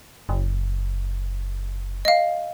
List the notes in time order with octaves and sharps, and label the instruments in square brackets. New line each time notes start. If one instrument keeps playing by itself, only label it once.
[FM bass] F#1
[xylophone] D#5 F5